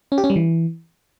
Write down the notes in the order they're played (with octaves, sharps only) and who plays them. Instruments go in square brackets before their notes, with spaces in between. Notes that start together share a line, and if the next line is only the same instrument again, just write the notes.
[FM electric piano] C#4
G4
C#4
G3
E3